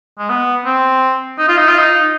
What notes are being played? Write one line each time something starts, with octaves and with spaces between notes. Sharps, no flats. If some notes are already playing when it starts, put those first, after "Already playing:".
G#3
B3
C4
D#4
F4
D#4
F4
D#4